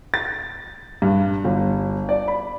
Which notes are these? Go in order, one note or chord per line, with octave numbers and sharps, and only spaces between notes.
A6
G2
G1
D5
B5